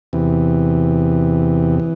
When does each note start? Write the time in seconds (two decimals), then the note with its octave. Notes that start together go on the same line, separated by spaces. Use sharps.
0.13 E2 C3 E3
1.80 E3